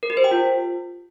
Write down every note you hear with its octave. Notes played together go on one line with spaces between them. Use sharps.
A#4
G4
C5
G5
F4